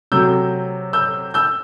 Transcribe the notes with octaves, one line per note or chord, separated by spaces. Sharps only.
C3 F#3 A3 E6 G6
E6 G6
E6 G6